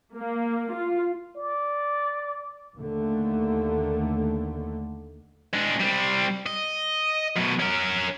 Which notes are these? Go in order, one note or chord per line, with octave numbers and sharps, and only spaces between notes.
A#3
F4
D5
D#2 D3 A3
G#3 D4
G3 C4
D#5
F#2 B2
C#4 A#4